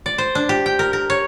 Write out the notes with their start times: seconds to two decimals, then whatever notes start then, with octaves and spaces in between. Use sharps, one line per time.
0.06 D5
0.18 C5
0.35 D4
0.49 G4
0.66 G5
0.79 A#4
0.93 A#4
1.10 C#5